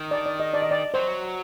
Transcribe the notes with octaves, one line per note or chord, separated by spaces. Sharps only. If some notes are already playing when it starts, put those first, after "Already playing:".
Already playing: D#3
D5
D5
D#5
D5
D#5
D5
F#3 C5